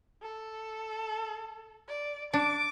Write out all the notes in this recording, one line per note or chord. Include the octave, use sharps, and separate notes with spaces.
A4
D5
D4 D6